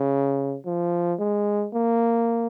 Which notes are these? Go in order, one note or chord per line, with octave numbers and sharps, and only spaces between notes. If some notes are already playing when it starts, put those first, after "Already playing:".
Already playing: C#3
F3
G#3
A#3